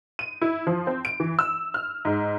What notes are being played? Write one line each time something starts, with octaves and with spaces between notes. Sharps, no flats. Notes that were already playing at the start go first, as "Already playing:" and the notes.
D#7
E4
F3
C4
D7
E3
E6
F6
G#2